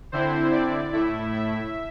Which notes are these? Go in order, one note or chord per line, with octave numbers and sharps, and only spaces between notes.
D3 C4 E4 C5
D5
A2 A3 E4 E5
E5